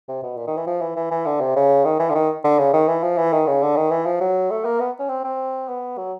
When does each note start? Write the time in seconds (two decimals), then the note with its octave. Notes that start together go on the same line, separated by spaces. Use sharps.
0.08 C3
0.23 B2
0.37 A#2
0.47 D#3
0.57 E3
0.67 F3
0.81 E3
0.96 E3
1.11 E3
1.26 D3
1.40 C3
1.56 C#3
1.85 D#3
1.99 E3
2.10 D3
2.15 D#3
2.44 D3
2.59 C#3
2.73 D#3
2.88 E3
3.03 F3
3.18 E3
3.33 D#3
3.47 C#3
3.62 D3
3.77 D#3
3.91 E3
4.06 F3
4.21 F#3
4.50 A3
4.65 A#3
4.80 B3
4.99 C#4
5.09 C4
5.24 C4
5.68 B3
5.98 F#3